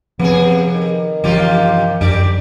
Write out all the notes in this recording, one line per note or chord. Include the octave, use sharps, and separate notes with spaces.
C3 F3 B3 C4 G#4
D#3
G2 C3 E3 F3 F4 G4
F#2 D3 G4 D5